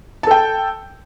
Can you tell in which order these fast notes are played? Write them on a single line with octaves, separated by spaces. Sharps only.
A5 A4 G5